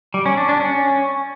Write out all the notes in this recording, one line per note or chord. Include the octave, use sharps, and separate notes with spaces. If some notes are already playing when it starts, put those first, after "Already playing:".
G3
C#4
D4
D4
C#4